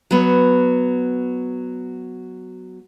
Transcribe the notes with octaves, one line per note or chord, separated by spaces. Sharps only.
F#3 B3